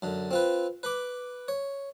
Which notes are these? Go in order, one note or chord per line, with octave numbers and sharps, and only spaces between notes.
F#2 D3
C4 F4 B4
B4 B5 D6
C#5